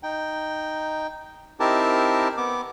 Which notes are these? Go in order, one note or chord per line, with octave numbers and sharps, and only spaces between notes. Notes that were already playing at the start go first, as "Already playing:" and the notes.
D#4 G5
C4 D#4 E4 G4 A#4 A5
B3 D6